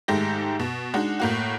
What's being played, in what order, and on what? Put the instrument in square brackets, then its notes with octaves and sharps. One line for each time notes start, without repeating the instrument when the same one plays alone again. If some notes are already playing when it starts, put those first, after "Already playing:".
[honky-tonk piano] G#2 D#3 G#3 A3 G4 A#6
B2
G#3 D4 D#4 F#4
A2 A#3 F#4